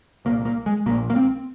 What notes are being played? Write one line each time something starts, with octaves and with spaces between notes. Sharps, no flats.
C2 A#2 A#3
A#3
G#3
A#1 A#2 A#3
A#3
C4